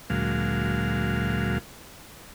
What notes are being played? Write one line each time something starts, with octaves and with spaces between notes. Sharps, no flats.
D2 A#2 F#3 G#3 F5